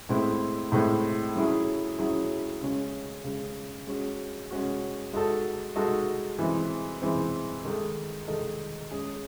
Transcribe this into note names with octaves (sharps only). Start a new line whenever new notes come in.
A2 G#3 C4 E4
A2 G#3 C4 E4
F#3 C#4 E4 G#4
F#3 C#4 E4 G#4
C#3 G#3 C#4
C#3 G#3 C#4
G#3 C#4 F#4
G#3 C#4 F#4
G#3 D#4 F#4 A4
G#3 D#4 F#4 A4
E3 G#3 C4
E3 G#3 C4
D#3 G#3 D#4 A4
D#3 G#3 D#4 A4
G#3 C#4 G#4